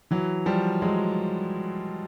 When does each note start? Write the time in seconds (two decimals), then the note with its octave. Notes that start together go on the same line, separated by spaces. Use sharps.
0.11 E3 F#3
0.46 F3 G3
0.82 F#3 G#3